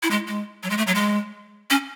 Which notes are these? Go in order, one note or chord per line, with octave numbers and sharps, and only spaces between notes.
E4
G#3
G#3
F#3
G#3
A3
F#3
G#3
C#4